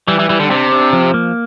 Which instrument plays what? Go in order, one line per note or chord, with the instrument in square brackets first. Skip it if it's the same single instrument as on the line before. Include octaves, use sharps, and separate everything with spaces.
[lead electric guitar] E3 [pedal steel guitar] G3
[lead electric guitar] E3
[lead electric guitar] E3 [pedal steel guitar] G3
[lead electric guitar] D3
[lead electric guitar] C3 [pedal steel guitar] D4
[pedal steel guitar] D4
F3
A#3